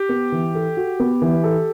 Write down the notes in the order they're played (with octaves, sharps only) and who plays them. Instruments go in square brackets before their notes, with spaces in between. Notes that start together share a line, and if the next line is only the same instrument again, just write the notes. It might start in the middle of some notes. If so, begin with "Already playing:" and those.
Already playing: [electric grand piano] G4
[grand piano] B3
E3
A4
F#4
B3
E3
A4